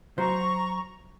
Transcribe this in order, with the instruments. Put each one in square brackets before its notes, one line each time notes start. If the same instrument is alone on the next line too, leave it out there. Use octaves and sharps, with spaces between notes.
[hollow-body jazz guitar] F#3 F#4 C5 [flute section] A#5 C#6